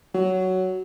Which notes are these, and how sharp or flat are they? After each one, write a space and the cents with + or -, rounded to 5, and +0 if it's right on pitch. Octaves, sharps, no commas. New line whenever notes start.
F#3 +10